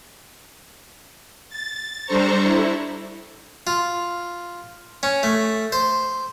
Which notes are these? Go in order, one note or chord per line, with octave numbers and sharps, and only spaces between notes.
A6
G3 D4 A4 C5 A#5 C#6
E4
F4
C#4
A3
C5